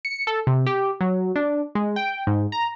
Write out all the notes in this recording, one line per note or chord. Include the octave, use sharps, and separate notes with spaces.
C#7
A4
C3
G4
F#3
D4
G#3
G5
G#2
A#5